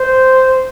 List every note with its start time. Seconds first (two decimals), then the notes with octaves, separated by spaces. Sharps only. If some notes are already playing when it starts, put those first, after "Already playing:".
Already playing: C5